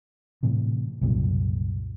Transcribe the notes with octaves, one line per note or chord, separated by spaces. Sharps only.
A2 C3 E3
C2 F#2 A#2 C#3